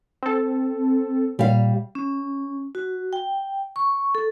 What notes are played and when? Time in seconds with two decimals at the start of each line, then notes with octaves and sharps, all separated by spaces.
0.23 C4 A4
1.39 A#2 G3 F5
1.95 C#4
2.75 F#4
3.13 G5
3.76 C#6
4.15 A4